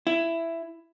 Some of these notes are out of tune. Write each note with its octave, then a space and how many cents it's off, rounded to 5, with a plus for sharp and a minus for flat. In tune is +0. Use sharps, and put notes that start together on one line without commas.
E4 +10